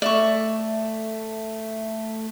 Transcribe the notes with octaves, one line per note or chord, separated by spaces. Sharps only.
A3 D5 E5 C#6